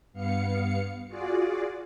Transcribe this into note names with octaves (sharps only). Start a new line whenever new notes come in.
G2 B3 F5 C#7
F4 F#4 G#4 D5